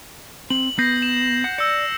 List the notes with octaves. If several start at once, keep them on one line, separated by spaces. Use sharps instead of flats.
C4 F#7
B3 G6 A#6 C7
E7
F#5
D5 E6 C#7